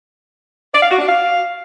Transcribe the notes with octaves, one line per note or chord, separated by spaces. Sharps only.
D5
F5
F#4
D4
F5